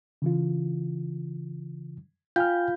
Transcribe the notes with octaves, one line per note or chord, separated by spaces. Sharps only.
C#3 E3 F4
F4 F5 G5 G#5 F6 G6